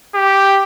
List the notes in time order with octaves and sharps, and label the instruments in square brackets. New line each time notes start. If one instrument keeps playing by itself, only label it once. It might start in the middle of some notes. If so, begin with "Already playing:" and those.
[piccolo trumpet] G4